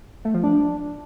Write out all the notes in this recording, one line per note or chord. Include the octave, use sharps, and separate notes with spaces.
A3
F3
D4